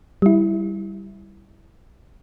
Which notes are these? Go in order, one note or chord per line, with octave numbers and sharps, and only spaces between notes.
G3 E4